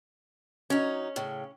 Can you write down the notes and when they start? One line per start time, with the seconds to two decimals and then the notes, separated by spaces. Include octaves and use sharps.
0.70 F#3 C#4 D#4
1.16 A2 C#3